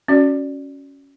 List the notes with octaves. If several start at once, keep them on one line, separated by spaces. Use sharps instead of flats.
C#4 F#4 D5